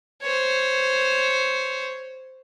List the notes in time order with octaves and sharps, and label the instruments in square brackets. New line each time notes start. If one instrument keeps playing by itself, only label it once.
[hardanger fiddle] C5 C#5